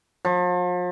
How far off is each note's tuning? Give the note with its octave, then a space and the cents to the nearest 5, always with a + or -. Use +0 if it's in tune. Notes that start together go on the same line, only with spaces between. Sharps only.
F3 +40